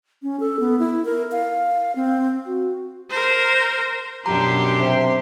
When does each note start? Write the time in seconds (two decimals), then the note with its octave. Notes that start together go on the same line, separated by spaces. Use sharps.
0.23 C#4
0.40 A4
0.60 B3
0.79 E4
1.05 A#4
1.32 F5
1.96 C4
2.46 F#4
3.10 A#4 C5
4.26 F#2 B2 D4 G4 A#5 C6
4.80 C3